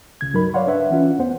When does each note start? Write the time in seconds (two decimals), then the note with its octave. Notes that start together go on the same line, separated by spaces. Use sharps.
0.21 C#2 C#3 G#6
0.33 G2 F#3 D#4 A#4 B5
0.54 C#5 D5 F5 F#5 C6
0.67 D4 B4 E5 F#5
0.90 E3 C#4 F4
1.19 E2 B3 C5 F#5